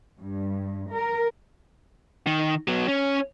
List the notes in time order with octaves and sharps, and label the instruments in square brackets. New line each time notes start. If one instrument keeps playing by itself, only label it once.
[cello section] G2
A#4
[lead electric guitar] D#3
F#3 B3
C#4